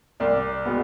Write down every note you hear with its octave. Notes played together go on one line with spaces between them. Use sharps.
C2 D5
B2 G#3 B3